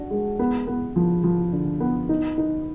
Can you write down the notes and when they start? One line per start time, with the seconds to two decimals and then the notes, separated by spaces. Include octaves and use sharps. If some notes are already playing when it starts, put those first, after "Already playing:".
Already playing: D4 F#4
0.11 G#3
0.39 B3
0.67 B3
0.96 F3
1.24 F3
1.53 D3
1.80 B3
2.09 D#4
2.38 D#4